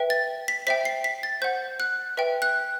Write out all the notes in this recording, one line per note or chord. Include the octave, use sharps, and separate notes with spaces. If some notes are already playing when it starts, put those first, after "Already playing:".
Already playing: B4 E5 G5
A6
B6
C5 E5 G5 B6
C7
B6
A6
C5 F#5 G6
F#6
B4 E5 G5
F#6